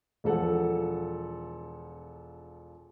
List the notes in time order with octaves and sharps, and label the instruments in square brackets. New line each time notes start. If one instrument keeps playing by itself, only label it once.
[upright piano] E1 F3 A4 F#5